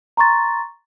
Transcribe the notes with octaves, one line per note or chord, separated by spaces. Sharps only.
A#5 C6 C#6 A6